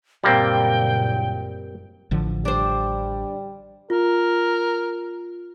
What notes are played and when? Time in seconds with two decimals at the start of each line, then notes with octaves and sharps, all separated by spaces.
0.24 F#1 A#2 G3 A#3 C4 G5
2.11 A1 D3 F3
2.45 G3 D4 C5
3.90 F4 A#4